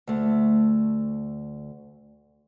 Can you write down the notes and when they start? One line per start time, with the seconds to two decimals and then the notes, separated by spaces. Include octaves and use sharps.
0.07 D2 A3